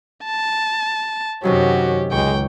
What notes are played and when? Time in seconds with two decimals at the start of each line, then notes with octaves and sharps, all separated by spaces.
0.25 A5
1.43 F#2 C3 D#3 F#3 C#4 F#4 G4
2.12 C#2 G#3 G5 C#6